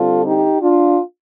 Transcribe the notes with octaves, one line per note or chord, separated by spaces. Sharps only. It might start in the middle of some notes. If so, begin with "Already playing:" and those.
Already playing: D3 G3 C4 F4 A4
D#4 G4
D4 F4